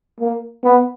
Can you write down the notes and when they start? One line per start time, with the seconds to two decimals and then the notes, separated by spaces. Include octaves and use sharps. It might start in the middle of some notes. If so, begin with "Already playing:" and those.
0.20 A#3
0.64 B3